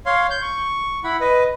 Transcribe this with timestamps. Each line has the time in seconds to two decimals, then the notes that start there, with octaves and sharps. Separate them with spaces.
0.06 C#5 F5 C6
0.30 G6
0.42 C#6
1.04 E4 F#5 B5
1.21 B4 D#5